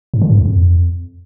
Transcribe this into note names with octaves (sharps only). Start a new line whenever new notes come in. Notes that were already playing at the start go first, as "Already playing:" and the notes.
G#2
D3
G#2
E2
F2